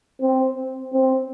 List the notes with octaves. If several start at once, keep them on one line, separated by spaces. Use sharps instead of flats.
C4
C4